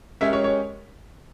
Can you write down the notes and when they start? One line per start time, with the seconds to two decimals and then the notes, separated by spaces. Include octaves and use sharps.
0.21 G#3 C#4 G4 A#4 E5
0.33 C#5
0.44 C#5